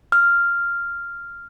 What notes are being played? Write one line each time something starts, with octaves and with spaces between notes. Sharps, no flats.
F6